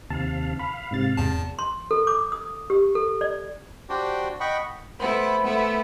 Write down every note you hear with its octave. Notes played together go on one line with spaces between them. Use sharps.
D#2 C3 F5 A5
F5 B5
G#2 C3 A6
E2 A5
C6
A4
D6
D#6
G4
A4
D5
D4 F#4 G4 C5
D#5 F#5 G5 B5 C#6
A3 B3 E4 C5 B5
A3 B3 E4